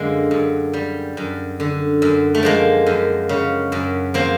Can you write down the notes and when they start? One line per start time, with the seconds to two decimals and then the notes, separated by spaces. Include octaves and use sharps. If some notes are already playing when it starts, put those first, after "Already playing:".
Already playing: F#2 D3 G#3 A#3
0.31 F#2
0.73 G3
1.17 F#2
1.60 D3
2.02 F#2
2.35 A3
2.43 F3 G#3 A#3
2.86 F#2
3.29 C#3
3.72 F#2
4.14 F3 A#3 C4